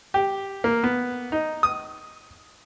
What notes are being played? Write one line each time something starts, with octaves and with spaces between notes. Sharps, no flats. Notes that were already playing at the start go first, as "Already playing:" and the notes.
G4
A#3
B3
D#4
D#6